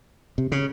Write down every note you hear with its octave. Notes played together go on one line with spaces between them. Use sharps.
C3
C#3